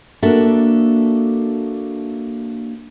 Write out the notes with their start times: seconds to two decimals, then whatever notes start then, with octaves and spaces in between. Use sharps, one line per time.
0.22 A#3 D4 F#4 A4 E5